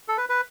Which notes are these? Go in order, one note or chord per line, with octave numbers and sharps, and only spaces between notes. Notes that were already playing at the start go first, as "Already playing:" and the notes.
A4
B4
B4